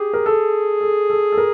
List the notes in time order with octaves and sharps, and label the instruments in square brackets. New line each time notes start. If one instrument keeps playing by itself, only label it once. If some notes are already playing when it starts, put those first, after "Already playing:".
Already playing: [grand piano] G4 [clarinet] G#4
[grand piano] A#4
A4
A4
A4
A4
A#4